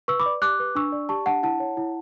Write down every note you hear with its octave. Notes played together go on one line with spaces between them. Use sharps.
B4 C#6 E6
B5 D6
D5
G4 D6 F#6
B4
D4 C#6 E6
D5
G4 A5 C#6
D4 F#5 A5
E4 F#5 A5
C#5
E4